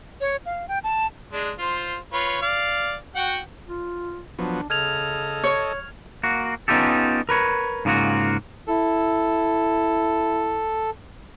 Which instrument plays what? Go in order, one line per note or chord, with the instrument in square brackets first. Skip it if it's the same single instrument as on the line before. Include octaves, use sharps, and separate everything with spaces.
[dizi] C#5
F5
G5
A5
[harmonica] G#3 D4
F4 C5
F4 B4 C#5
D5 F5
F#4 F#5 G5
[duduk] F4
[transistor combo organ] F3 F#3 B3 [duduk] D4
[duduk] C#3 [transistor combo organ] A4 D#5 [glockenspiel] F6 G#6 F7
[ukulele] C#5
[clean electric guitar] A#3 F#4
B3 C#4 D#4 F4 G4 A4
A#4 B4 C#5
G#2 C#3 A#3 F4 F#4
[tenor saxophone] E4 [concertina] A4